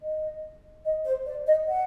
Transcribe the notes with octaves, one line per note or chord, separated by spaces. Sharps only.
D#5
D#5
C5
D5
D#5
F#5